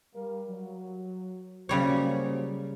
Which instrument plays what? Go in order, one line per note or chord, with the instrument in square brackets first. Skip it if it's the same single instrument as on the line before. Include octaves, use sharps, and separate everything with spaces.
[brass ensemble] G3 A#4 F5
F#3
[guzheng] C#3 G3 C#5 [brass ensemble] F#3 A#3 C5